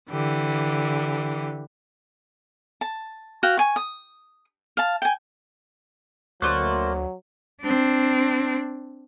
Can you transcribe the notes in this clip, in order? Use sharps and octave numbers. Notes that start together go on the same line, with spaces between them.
D3 E3 G4
A5
F#4 F5 G5
G#5 C#6
D#6
F5 A5
G5 G#5
D2 F#3 A3 A#3 C5 D5 C#6 F#6
C4 D4